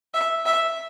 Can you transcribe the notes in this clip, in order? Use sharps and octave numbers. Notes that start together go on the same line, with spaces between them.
E5
E5